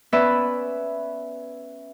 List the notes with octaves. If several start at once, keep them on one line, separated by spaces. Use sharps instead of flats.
B3 C#4 B4 D5 E5